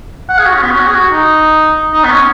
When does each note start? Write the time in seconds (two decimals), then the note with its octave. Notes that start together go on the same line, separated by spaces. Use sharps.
0.29 F#5
0.38 G#4
0.46 F#4
0.54 C#4
0.63 B3
0.71 C#4
0.79 F#4
0.87 G#4
0.95 F#4
1.12 D#4
1.94 D#4
2.04 B3
2.11 C#4